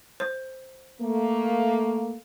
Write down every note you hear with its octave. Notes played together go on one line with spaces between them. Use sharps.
C5
A3 A#3